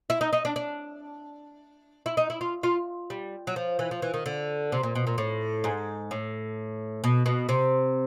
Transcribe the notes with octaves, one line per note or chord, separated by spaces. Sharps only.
E4
D#4
D#4
D4
D4
E4
D#4
E4
F4
F4
G3
F#3
F3
E3
F3
E3
D#3
D3
C3
A#2
B2
A#2
A2
G#2
A2
B2
B2
C3